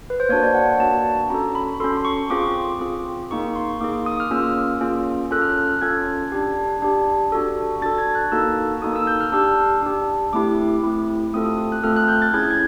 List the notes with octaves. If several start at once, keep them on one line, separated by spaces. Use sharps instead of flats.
B4
C5
A#3 D4 F#4 C#5
D5
F#5
A#3 D4 F#4 A5
C#4 F#4 A4 A#5
B5
C#4 F#4 A4 C6
C6
C#6
C4 F4 G#4 D6
C4 F4 G#4
A#3 D#4 G#4 C#6
C6
A#3 D#4 G#4 D6
D#6
F6
A#3 C#4 F4 G#4 E6
A#3 C#4 F4 G#4
C#4 F4 A4 F#6
F6
F#6
C#4 F4 A4 G#6
D4 G4
D4 G4
D4 F#4 A4
D4 F#4 A4 A6
G#6
F#6
A#3 D#4 F#4 A4 E6
A#3 D#4 F#4 A4 D#6
E6
G6
F6
D4 G4 E6
D4 G4
A3 C4 E4 G4 D6
A3 C4 E4 G4
A3 C4 F4 A4 D#6
D#6
F#6
A3 C4 F4 A4 F6
F#6
G6
A6
C#4 E4 G#4 G#6
G#6